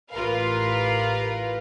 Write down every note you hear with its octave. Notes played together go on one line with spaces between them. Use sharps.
A1 F4 G4 A#4 B4 F5